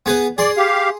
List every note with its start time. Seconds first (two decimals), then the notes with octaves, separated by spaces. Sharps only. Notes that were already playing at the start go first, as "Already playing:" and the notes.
0.06 B3 G#4 B4
0.38 G#4 D5 C6
0.57 G4 F5